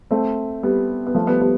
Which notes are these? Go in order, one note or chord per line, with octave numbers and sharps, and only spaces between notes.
A3 C4
G3 B3
B3
F3 A3
G3 B3
G3 B3